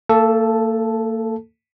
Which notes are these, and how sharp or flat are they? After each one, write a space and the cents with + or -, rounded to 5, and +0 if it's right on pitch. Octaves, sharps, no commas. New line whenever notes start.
A#3 -40 A4 +0 A5 -5